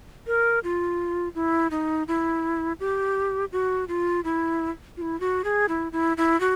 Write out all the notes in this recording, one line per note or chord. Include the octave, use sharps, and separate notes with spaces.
A#4
F4
E4
D#4
E4
G4
F#4
F4
E4
F4
E4
F#4
G#4
E4
E4
E4
F#4